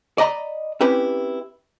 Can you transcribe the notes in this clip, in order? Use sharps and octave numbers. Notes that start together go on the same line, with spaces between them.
D5 D#5 A#5 B5
C4 C#4 E4 G4 B4